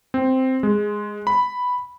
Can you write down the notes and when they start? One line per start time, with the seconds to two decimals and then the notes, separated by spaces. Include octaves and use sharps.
0.14 C4
0.63 G#3
1.27 B5